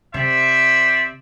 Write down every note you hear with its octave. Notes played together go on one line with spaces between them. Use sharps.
C3 C5 D5 E5